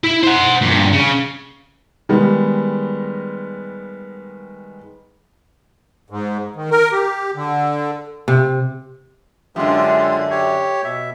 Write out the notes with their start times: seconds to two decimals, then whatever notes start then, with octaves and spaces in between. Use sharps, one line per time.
0.04 E4
0.23 C5 F#5
0.62 G2 A#2
0.93 C#3
2.09 D#3 G3 G#3 B3
6.10 G#2
6.56 D#3
6.71 A#4
6.92 G4
7.36 D3
8.28 C3
9.56 F#2 D3 G#3 F4 G4
10.30 G4 C#5
10.84 B2 E5